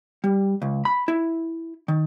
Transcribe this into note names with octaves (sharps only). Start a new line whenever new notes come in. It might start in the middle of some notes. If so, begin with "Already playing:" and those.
G3
C#2
B5
E4
D#3